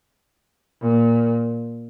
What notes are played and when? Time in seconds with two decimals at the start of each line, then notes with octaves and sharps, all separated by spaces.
0.81 A#2